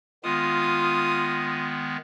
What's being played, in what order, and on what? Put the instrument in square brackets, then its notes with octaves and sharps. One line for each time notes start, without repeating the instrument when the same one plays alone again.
[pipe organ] D#3 G#3 B3 [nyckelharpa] F4 D#6